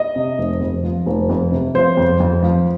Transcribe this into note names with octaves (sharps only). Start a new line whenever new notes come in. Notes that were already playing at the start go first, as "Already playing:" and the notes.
Already playing: D#5
C3
F1
F2
F3
F1
F2
C3
F3 C5
F2
F2
F3